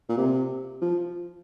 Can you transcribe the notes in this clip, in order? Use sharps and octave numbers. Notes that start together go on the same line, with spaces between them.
A#2
C3
F3